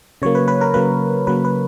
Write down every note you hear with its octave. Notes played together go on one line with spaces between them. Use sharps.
C#3 F#3 A#3 C#5
B4
B4
A#4
C#3 F#3 A#3 B4
C#3 F#3 A#3 B4
B4